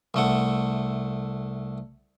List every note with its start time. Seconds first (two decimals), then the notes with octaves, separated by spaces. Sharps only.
0.14 C2 A3 F#5